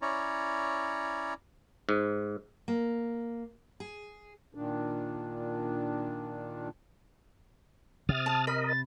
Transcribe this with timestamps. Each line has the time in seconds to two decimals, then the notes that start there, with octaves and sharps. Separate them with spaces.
0.02 C#4 E4 C#5 D5 A#5
1.89 G#2
2.68 A#3
3.80 G#4
4.55 A#2 D#3 D4
8.09 C3 D#6 F6 A6
8.26 A5
8.47 A#4 D#5 B5 F6
8.67 A6